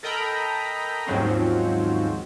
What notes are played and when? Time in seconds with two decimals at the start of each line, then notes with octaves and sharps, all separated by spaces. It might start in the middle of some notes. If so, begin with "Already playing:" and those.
0.03 A4 A#4 D#5 G5 A#5 B5
1.07 D#2 G#2 F3 F#3 C4 C#4